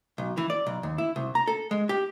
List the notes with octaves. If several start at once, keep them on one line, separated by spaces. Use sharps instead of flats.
B1
E3
D5
B1
D#2
E4
C2
A#5
A4
G#3
G4